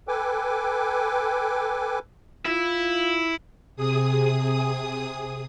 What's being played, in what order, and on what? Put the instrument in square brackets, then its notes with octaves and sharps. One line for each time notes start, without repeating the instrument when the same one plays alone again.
[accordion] A4 B4 G5 G#5 D6
[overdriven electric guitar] E4 [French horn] F4
[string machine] C3 G#4 D#6